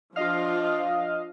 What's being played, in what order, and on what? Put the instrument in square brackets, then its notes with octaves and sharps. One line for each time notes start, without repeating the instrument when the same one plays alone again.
[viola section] F3 D4 F4 [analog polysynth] D#5 F5